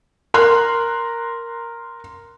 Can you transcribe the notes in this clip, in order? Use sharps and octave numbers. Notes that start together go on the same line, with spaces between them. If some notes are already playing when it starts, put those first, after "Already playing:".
A#4 A#5 C6 F#6